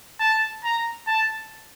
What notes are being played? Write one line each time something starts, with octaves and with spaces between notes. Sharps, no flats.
A5
A#5
A5